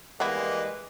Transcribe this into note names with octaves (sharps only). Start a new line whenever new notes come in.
E3 G3 G#3 A#3 B3 E4 B4